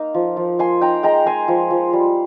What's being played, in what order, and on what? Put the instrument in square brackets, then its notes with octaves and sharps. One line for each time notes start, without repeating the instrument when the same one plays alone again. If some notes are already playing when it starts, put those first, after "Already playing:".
Already playing: [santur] A#3 D#4 A#5
F3
F3
A#3 G#5 C6
D#4 G5 A#5
G#3 G5 A#5
G#3 G#5 C6
F3
F3
G3